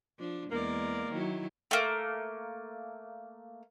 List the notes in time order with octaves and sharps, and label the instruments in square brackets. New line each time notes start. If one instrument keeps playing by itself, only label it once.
[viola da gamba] F3 D4
[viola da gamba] E2 G#3 D5 [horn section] A#3 A#4
[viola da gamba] D#3 F#3 E4
[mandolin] A3 A#3